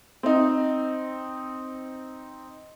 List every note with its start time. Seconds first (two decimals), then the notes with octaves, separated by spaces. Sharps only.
0.23 C4 D#4